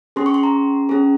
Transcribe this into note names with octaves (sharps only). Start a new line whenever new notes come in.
C#4 G#4 C6
C#6
C6
A#5
C#4 G#4